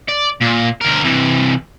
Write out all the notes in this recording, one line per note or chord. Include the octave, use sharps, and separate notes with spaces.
D5
A#2
D2 A#4
C3 E3